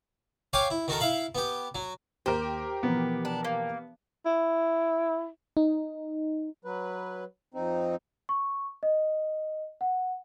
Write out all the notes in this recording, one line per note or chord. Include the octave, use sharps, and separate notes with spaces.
C#5 F5 G5 G#5 D6
E4
D#3 F#4 A4 A#4
E4 E5 F5 B5
B3 G4
F#3
D#2 G4 A#4 C5
B2 E3 F3 B3
D4
A#3
E4
D#4
F#3 B4
F2 C4 D#4
C#6
D#5
F#5